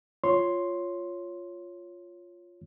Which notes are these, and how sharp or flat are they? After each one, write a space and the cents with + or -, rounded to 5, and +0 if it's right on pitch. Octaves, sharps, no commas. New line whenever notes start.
F4 +0 C#5 +0 C6 +0